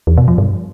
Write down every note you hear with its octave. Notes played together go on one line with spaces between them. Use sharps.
E2
B2
F3
G2